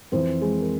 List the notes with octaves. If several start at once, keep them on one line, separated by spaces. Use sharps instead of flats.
F2 E3 C4 C5
G#3 G#4
A#4